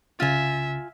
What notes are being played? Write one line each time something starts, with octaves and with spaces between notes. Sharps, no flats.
C2 C#3 F4 E5 G#5 A6